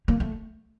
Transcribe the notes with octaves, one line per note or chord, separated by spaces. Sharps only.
A#3
A3